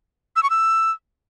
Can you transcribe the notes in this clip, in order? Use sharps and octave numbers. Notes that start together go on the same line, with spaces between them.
E6
C#6
E6